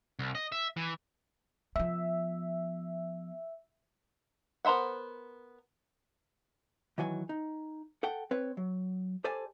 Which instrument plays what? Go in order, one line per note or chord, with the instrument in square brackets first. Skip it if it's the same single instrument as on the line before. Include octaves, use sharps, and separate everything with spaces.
[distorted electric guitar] C2
D#5
E5
E3
[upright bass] F3 B3 [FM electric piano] E5
[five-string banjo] B3 A#4 C5 E5 F#5
[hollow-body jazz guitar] D#3 E3 F#3 G#5
D#4
A4 F#5 G5
C4 B4 C#5
F#3
G4 A4 C5 D5 G#5 A5